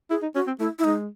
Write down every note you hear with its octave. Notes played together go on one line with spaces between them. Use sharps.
E4 G#4
D#4
C#4 F#4
C4
A3 E4
E4
G#3 D#4